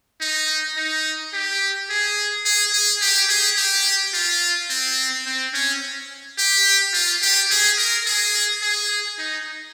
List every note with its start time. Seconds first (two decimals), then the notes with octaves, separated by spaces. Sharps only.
0.21 D#4
0.77 D#4
1.33 G4
1.89 G#4
2.45 G#4
2.73 G#4
3.02 G4
3.29 G#4
3.57 G4
4.14 F4
4.70 C4
5.26 C4
5.54 C#4
6.38 G4
6.94 F4
7.22 G4
7.50 G#4
7.78 A#4
8.06 G#4
8.62 G#4
9.18 D#4